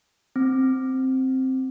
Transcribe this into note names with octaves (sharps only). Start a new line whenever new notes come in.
C4